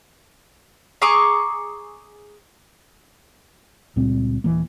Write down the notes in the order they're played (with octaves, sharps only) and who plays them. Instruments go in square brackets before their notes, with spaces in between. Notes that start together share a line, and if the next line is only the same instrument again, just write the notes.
[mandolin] G#4 A#5 C#6 D6
[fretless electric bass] C#2 A#2 G3 C4
D#1 E3 A#3